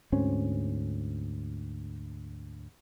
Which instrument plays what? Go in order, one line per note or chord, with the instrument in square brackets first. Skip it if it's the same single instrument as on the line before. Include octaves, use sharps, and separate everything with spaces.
[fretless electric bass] D2 G#2 C4 C#4